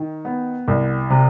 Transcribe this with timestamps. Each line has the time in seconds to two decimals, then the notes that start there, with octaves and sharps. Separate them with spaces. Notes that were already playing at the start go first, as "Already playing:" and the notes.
Already playing: D#3
0.25 B3
0.68 C2
1.10 C3